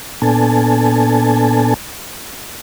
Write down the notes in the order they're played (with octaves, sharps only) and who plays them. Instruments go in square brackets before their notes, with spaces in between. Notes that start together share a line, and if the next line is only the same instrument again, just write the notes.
[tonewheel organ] A#2 B3 D4 A4 G#5 A5